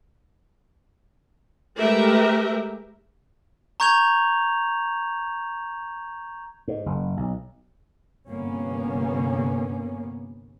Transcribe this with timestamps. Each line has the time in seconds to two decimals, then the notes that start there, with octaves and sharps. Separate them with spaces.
1.78 G#3 A3 G4 A#4 B4 E5
3.80 A#5 C#6 G6 G#6 F7
6.68 G#2
6.86 F#1
7.17 B1
8.28 G1 C3 A#3 B3 C#4